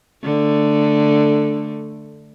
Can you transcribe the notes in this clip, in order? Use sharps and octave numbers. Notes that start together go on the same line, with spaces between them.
D3 A3